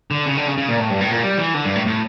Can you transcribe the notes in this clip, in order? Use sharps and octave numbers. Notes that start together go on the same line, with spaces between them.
D3
C#3
D3
C#3
C#3
A#2
A2
G2
A2
A#2
G3
E3
D3
G2
A2
A2